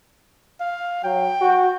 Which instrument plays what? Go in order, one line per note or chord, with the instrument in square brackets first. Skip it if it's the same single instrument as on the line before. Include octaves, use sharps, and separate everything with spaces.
[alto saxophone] F5
[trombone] F#3 [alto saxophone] G5
[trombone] F#4